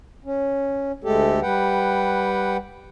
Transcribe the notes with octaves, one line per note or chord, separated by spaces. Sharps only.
C#4
D2 G#3 A3 G4 A4
G3 B4 F#5 G5